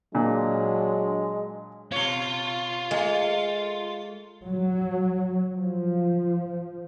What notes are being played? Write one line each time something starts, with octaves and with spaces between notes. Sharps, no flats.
A#2 F#3 G#3 D4
B2 F4 C#5
G#3 A3
F#3
F3